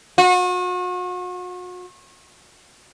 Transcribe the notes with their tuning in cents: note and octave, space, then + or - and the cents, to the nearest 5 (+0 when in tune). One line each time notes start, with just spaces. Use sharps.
F#4 -40